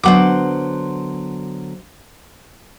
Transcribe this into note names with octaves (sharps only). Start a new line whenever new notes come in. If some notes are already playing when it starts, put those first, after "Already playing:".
D3 F#3 B3 C5 F#5 D6